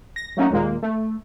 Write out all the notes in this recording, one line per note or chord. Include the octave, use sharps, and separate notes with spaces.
A#6
F#3 A3 A#3 C#4 D#4 F#4
D#2 A#2 G#3 A#3
A3